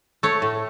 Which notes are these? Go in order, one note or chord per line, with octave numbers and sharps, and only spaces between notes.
A3 C#5
A2